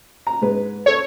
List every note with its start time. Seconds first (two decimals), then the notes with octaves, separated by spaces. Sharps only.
0.27 A#5
0.42 G#2 G#3 B4
0.86 A4 C5 C#5